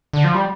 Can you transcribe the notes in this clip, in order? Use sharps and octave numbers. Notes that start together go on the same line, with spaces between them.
D3
F3
G3